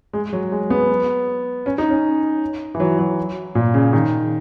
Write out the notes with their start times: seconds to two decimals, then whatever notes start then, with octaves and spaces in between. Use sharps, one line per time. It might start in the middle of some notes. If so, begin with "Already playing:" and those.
0.13 G#3
0.33 F#3
0.52 G#3
0.70 B3
1.66 C#4
1.78 D#4
1.90 C#4
2.75 E3
2.80 F#3
2.99 F#3
3.55 A#2
3.74 C#3
3.93 D#3